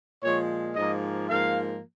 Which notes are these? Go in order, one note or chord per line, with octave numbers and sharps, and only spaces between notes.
A#2 F3 G#3 C#5
G#2 F3 A#3 D#5
G#2 F3 A#3 F5